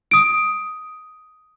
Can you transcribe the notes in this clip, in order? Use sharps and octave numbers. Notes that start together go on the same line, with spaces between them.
D#6 D7